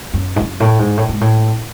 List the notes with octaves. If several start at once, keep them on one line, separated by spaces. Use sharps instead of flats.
F#2
G#2
F#2
A2
G#2
A2
G#2
A2